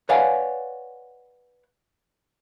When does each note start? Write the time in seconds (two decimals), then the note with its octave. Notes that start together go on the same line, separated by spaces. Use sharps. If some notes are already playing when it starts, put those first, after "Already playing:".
0.09 B4 C#5 D5 F5 F#5 G#5